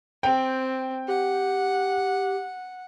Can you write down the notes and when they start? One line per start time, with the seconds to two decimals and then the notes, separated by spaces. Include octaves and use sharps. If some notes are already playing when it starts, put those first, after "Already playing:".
0.23 C4 G5
1.08 G4 F#5